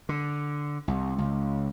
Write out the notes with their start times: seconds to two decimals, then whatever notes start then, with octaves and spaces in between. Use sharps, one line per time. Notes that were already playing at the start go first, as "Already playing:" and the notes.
0.09 D3
0.88 C2
1.19 C#2